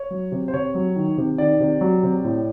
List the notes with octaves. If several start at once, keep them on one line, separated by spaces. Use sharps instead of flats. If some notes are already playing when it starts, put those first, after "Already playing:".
Already playing: C#5
F#3
C3
C5
C3 C#5
F#3
D#3
C3
D#3 D5
C3
F#3
C3
A2